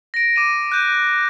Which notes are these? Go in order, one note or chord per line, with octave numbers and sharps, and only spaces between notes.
A#6 D7
D6 D#7
F#6 G6 D#7